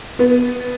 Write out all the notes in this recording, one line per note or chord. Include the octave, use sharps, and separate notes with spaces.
B3